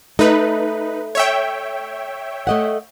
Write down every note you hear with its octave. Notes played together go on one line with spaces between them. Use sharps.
A3 D#4 B4
C#5 E5 G5
A3 D#5 F#5